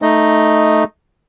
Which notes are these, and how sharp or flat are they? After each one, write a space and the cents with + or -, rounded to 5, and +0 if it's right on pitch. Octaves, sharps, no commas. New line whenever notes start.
A3 -5 D#4 +0 D#5 +0